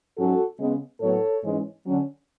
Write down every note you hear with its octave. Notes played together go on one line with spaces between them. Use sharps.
G#2 F#3 C#4 F#4 A4
C#3 G#3 B3
A2 F#3 B3 A4 C#5
G#2 E3 G#3 C#4
D3 F#3 C#4